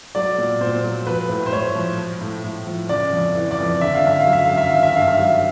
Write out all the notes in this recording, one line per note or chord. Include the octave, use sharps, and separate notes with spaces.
F#3 D5
A#2
A#2 C5
F#3
F3 B4
A2
C5
A2 C#5
F3
F3
A2
A2
F3
C#3 D5
F2
E3
D5
F2
D3 E5
F5
F#2 E5
F5
F#3
E5
F5
F#2
E5
D#3 F5
E5
G2 F5
E5
F#3